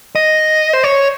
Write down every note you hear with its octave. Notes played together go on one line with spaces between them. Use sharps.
D#5
C5
C#5